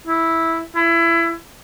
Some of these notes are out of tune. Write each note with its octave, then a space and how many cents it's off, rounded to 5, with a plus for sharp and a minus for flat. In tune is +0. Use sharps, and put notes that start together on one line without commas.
E4 -5
E4 +25